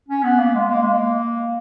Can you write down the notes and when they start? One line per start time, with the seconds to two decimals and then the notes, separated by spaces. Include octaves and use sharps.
0.08 C#4
0.23 B3
0.39 A#3
0.54 G#3
0.69 A#3
0.82 G#3
0.94 A#3